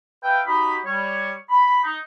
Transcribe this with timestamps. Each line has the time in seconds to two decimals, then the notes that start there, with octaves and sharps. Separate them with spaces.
0.24 B4 E5 F5 G5
0.47 D#4 F#4 G4 B5
0.86 G3 C#5
1.50 B5
1.84 D#4